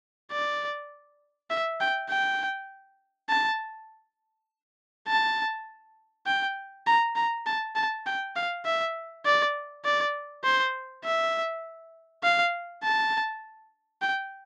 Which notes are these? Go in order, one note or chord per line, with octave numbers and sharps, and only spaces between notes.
D5
E5
G5
G5
A5
A5
G5
A#5
A#5
A5
A5
G5
F5
E5
D5
D5
C5
E5
F5
A5
G5